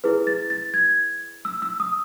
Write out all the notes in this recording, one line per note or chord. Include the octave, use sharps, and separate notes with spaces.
E4 G#4 B4
A6
A6
G#6
E6
E6
D#6